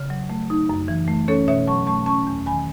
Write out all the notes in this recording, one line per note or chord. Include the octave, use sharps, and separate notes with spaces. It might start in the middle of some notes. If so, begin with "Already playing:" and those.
Already playing: C#3
F#3
A3
D#4
F#2
E3
A3
C#4 A4 C#5
B2 C#5 E5
F#3 A5 C#6
A3 A5 C#6
C#4 A5 C#6
E2
D#3 G#5 B5